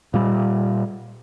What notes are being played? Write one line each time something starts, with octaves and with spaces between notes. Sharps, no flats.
A#2 G3